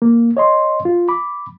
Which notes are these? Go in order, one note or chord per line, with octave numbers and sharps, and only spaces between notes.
A#3
C#5 D#5 C6
F4
B5 D6